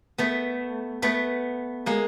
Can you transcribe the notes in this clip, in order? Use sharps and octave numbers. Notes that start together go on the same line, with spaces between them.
A3 B3
A3 B3
G#3 A#3